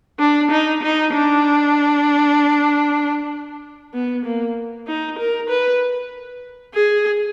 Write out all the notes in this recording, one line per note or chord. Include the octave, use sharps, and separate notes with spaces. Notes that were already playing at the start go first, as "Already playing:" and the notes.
D4
D#4
D#4
D4
B3
A#3
D#4
A#4
B4
G#4